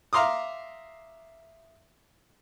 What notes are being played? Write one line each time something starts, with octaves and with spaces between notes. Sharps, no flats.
E5 F5 A#5 C6 D6 D#6